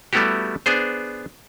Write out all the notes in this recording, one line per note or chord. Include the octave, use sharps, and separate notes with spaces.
G3 A3 B3 E4 F#4 G4
B3 D4 G#4 C5